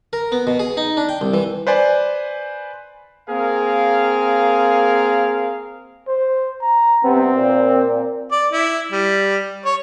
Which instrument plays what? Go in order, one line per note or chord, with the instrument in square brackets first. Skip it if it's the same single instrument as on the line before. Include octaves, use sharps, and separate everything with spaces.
[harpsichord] A#4
B3
B2
G#4
D#4
D4
G5
C2
E3
[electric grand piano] B4 C5 D5 G#5
[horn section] A#3 C4 G#4 A#4 F5
[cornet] C5
A#5
[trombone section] G2 C3 B3 [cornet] C4
[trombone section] A#2
[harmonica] D5
E4
G3
C#5